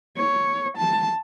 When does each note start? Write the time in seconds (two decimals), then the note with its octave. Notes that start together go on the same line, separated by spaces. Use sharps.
0.17 C#5
0.77 A5